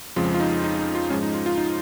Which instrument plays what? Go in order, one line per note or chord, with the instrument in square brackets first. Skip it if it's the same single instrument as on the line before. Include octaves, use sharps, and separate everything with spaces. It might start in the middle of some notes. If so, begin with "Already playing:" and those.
[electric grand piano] F2 C#3 F3 G#3 F4
F4
D#4
D#4
D#4
F4
G#2 F3 G#3 C#4
D#4
F4
F4
D#4